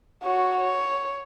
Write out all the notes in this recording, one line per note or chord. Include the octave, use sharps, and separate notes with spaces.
F#4 C#5
C#5